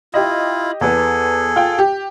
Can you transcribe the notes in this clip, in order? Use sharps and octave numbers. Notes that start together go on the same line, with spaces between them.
E4 F4 G4 D#5
E2 B3 G#4 A4
F4 G5
G4